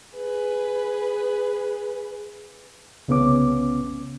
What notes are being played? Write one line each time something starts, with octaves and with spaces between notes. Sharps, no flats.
G#4 B4
C2 C#3 B3 C#4 D6